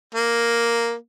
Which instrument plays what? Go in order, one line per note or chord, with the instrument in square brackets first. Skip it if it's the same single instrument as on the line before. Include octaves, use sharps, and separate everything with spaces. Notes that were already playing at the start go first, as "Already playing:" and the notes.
[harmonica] A#3